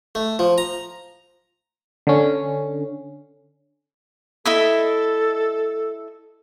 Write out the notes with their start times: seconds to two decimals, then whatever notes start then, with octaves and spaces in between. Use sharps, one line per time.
0.15 A3
0.39 F3
0.58 A#5
2.07 D3 C#4
4.45 E4 A4 D#5 E5